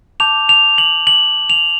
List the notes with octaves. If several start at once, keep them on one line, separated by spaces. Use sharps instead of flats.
A5 D6 G6 F7
F7
F#7
F#7
F7